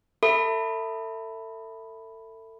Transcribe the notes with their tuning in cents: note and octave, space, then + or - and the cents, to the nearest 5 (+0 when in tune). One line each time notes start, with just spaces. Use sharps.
A4 +35 E5 +0 B5 +0